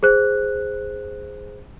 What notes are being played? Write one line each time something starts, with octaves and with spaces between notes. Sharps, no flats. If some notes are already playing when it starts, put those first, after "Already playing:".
G#4 C5 F#6